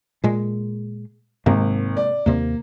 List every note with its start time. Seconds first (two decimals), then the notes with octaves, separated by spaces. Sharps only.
0.24 A#2 G#3
1.46 G#1 C3 G#3 A#3
1.97 D5
2.26 D#2 C3 A#3